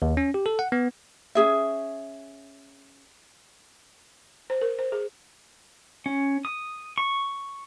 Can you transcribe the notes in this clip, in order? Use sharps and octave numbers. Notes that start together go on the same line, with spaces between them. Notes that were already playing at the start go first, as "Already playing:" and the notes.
D#2
C#4
G4
A4
F#5
B3
C#4 G#4 E5
C5
A#4
C5
G#4
C#4
D#6
C#6